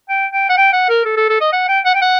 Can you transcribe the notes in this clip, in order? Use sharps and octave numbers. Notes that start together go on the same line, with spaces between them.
G5
G5
F#5
G5
F#5
A#4
A4
A4
A4
D#5
F#5
G5
F#5
G5
F#5